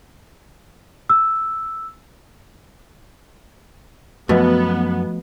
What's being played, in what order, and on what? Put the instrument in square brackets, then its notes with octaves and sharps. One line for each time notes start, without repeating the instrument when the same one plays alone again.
[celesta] E6
[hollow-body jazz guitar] F#2 [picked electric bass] F3 A3 [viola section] B3 [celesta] F#4 B4 D#5